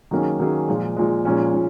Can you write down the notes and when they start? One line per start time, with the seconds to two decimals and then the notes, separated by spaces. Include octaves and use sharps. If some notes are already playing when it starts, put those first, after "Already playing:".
0.11 D#3 F#3 A#3 C#4 G#4
0.39 D#3 F#3 A#3 C#4 G#4
0.68 A#2 F3 G#3
0.97 A#2 F3 G#3
1.25 A#2 F3 G#3 C#4
1.54 A#2